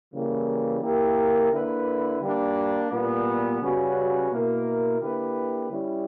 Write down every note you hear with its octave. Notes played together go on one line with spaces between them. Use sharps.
C#3 E3 G3 A#3 E4
A#3 E4 G4 A#4
D3 A#3 E4 B4
G3 A#3 D4
A#2 G3 B3
C#3 G3 C#4 F#4 B4
B2 A#3 E4 A#4
D3 A#3 E4 G4 B4
G3 C#4 E4